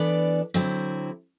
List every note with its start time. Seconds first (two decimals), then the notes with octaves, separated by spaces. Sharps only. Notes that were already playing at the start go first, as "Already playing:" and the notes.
Already playing: E3 B3 D4 A4 D5
0.54 D3 F#3 C4 E4